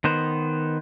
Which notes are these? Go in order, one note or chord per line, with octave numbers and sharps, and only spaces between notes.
D#3 B3 C5